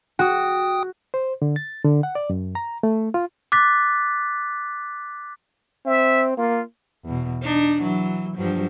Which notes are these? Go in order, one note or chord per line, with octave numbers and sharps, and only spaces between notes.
F#4 G5 D#6
C5
D3
A6
D3
F#5
D5
F#2
A#5
A3
F4
D6 F#6 A6 B6
C4 E5
A#3 F4
E2 B2
D4 D#4
E3 F#3
G2 F3 F#3